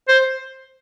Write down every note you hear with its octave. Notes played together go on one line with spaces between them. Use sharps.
C5